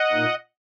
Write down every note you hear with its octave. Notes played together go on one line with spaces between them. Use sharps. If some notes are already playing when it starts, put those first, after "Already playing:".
Already playing: D#5 F#5
A#2 A#3 D#4